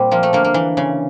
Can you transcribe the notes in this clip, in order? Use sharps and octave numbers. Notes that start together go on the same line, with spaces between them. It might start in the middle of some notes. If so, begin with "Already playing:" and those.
Already playing: A#2 G3 C4
F3 A#3
A3
D3 A#3
A#3
E3
C#3